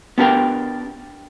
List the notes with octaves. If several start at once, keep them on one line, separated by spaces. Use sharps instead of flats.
B3 D4 G4 A#4 G5